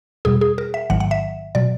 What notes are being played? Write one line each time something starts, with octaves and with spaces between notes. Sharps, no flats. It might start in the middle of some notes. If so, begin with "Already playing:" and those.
E2 B2 G3 G#4
G#4
A#4
E5
A1 G#2 D#3 F#3 F#5
F#5
E5
B2 F#3 D5